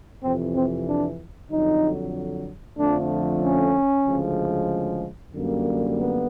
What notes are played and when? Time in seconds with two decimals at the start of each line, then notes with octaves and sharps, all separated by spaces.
0.23 F2 C3 E3 C4
0.54 C4
0.86 D4
1.50 F2 D3 F#3 D#4
2.77 F2 D3 F3 A3 D4
3.42 C#4
4.05 D2 C#3 F3 G#3
5.33 F#2 D3 G3 A#3
5.97 B3